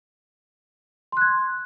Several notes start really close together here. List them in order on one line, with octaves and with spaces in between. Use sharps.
C6 F#6 G#6